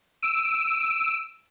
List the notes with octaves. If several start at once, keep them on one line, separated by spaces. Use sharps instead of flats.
E6 D7 D#7